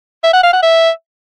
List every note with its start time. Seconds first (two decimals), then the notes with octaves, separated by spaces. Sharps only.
0.24 E5
0.33 F#5
0.43 F5
0.53 F#5
0.62 E5